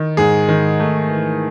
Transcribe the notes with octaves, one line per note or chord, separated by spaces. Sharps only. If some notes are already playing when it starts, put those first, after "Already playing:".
Already playing: D#3
G#2 G#4
D#3
A3
E3